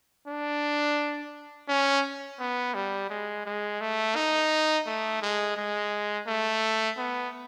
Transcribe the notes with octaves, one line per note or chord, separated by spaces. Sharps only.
D4
C#4
B3
G3
G#3
G#3
A3
D#4
A3
G#3
G#3
A3
B3